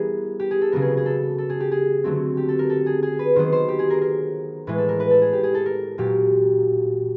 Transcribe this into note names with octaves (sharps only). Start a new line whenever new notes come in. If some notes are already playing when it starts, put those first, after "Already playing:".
Already playing: E3 G3 B3 G#4 A#4
G4
G#4
A4
C#3 F#3 B3 A#4
G#4
G#4
A4
A4
G#4
G4
G#4
D3 F#3 A3 C4
G4
A4
A#4
A4
G#4
G#4
B4
D#3 F#3 B3 C5
C5
G4
G#4
A#4
A#4
A2 E3 G#3 B4
A4
A#4
B4
A4
G#4
G4
G#4
A4
A#4
A#2 F#3 A#3 G4